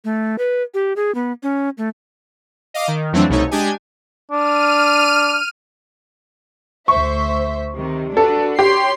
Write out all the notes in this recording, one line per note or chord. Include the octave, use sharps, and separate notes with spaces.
A3
B4
G4
G#4
B3
C#4
A3
D#5 F5 D6
D#3
F2 E3 F#3 A3 C4 D4
C2 B2 A3 D#4 C#5
G#3 D4 G4 G#5
D4 F6 D#7
D2 C5 E5 C#6
C3 D#3
D4 F#4 A4 B4
G4 C#5 C6 C7